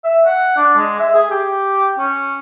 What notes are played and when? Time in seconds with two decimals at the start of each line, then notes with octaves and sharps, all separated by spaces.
0.04 E5
0.26 F#5
0.57 D4
0.77 G#3
0.99 E5
1.14 G#4
1.31 G4
1.98 C#4